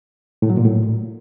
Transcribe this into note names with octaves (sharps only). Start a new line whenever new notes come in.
A2
F#3
A#2
A2